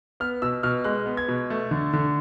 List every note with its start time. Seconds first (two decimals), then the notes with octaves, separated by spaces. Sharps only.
0.20 B3 F6
0.42 B2 E6
0.63 B2 F6
0.84 G#3 F#6
1.06 B3
1.17 G#6
1.28 B2
1.50 A3
1.71 D3
1.93 D3